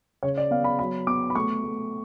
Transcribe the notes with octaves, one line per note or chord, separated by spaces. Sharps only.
C#3 C#5
D5
B3 F5
B5
F#3 B5
B3 D6
B5
A3 C#6
A3